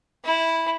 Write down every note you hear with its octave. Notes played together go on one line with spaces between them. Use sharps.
E4